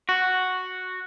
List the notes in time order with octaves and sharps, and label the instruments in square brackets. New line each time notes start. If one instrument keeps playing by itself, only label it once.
[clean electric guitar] F#4